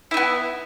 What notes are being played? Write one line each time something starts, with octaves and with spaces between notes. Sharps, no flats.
B3 D#4 E4